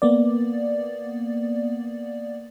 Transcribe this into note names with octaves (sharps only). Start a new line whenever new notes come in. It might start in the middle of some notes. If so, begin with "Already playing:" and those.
A#3 B3 D5